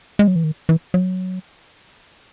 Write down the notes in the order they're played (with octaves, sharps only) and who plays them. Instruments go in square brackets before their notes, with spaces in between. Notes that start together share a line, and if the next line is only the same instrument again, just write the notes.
[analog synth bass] G#3
F#3
E3
D#3
E3
F#3